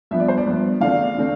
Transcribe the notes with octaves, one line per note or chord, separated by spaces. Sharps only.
G2 F3 B3 E5
D5
C5
D5
G2 F3 B3
E2 D3 A3 C4 F5
D3 A3 C4